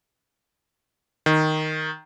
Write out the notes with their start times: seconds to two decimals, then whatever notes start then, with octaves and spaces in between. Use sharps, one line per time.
1.26 D#3